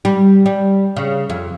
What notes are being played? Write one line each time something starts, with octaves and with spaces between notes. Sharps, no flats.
G3
G3
C#3
F2